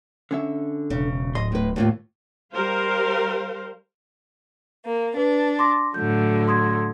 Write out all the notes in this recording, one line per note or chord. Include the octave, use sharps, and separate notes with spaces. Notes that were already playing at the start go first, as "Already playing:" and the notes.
D3 C#4 E5
E1 C#3
D1 D#5 C6
A2 B4
D#2 A2 F4
G3 A#4 C5 F5
A#3
D4 B4
C6 D6 A#6
A2 D3 F#3 G6
C6 D#6 G#6